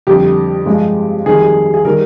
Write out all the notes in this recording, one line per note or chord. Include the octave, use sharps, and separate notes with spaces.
F2 D3 G3 G4
G2 F3 G#3
F2 D#3 G3 G#4
G#4
D#3 G3 A#4